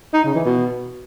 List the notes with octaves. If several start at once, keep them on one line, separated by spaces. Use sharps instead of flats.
D#4
C#3
E3
B2